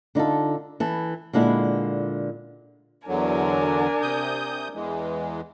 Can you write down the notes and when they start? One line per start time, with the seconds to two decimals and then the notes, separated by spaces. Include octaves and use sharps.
0.15 D3 D#4 F4 A4
0.80 E3 A4
1.33 A#2 D3 G#3 E4
3.08 E2 D3 F#3 D4 A#4 G#5
4.02 C3 D#6 G6
4.74 E2 E3 G#3